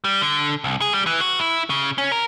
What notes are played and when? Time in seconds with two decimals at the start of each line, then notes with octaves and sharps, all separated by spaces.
0.04 G3
0.22 D3
0.64 C2
0.81 G#4
0.94 G3
1.06 E3
1.21 F#4
1.40 E4
1.70 C#3
1.98 C#4
2.12 A#4